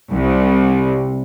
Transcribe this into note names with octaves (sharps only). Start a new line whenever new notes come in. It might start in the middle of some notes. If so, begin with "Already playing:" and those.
C2